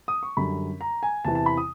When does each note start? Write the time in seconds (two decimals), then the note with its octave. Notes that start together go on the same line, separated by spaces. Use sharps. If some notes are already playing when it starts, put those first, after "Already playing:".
0.08 D#6
0.23 C#6
0.37 F#2 D3 G3 B5
0.81 A#5
1.03 G#5
1.25 E2 C3 E3 A5
1.35 A5
1.46 B5
1.57 D#6